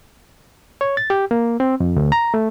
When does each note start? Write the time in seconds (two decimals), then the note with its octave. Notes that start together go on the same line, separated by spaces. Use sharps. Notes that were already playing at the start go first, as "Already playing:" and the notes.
0.81 C#5
0.97 A6
1.10 G4
1.31 A#3
1.60 C4
1.80 F2
1.96 D2
2.12 A#5
2.34 A3